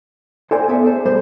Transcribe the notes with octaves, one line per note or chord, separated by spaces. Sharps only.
A4 A#4 C5 D5 G#5
B3 A4 D5 E5
G#4 A4 C5
G3 A4 C5